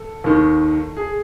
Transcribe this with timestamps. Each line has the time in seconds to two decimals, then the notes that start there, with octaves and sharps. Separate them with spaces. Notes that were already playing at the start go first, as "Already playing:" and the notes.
Already playing: A4
0.24 D#2 D#3
0.97 G#4